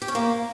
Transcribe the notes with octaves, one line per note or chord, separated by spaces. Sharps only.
G4
C#4
A#3